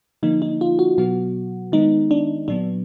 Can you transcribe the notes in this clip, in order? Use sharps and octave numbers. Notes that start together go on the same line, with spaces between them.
D3 F3 A#3 D#4
D#4
F4
F#4
B2 F#3 B3 F#4
D#3 G#3 B3 D#4
D4
A#2 F#3 B3 D4